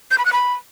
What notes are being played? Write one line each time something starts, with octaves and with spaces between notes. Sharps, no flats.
G6
B5
F#6
B5